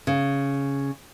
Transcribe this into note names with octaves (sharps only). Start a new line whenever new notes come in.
C#3